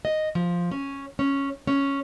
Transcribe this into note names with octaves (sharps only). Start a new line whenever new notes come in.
D#5
F3
C#4
C#4
C#4